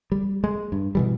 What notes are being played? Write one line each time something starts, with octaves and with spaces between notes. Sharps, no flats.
G3
G#3
G2
B2 E3 G3